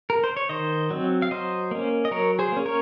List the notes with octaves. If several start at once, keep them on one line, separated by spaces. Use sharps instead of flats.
A#4
C5
C#5
D#3 C5 D#5
F#3 C4
F5
F#3 C5 D#5
A#3 C#4
D#5
F#3 A#4 C#5
G#4 C5
A#3 C#4
A#4 C#5